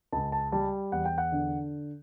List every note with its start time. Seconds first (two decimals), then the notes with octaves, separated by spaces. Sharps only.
0.12 C#2 A5
0.32 A5
0.52 G3 A5
0.92 E2 F#5
1.05 G5
1.18 F#5
1.32 D3